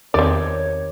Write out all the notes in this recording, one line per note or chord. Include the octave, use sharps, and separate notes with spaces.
E2 D#3 C4 G4 C#5 D5